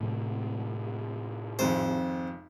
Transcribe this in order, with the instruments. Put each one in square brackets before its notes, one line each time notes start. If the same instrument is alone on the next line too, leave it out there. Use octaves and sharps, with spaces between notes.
[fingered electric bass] A2 C3 F#3
[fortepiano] G#1 F2 [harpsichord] C5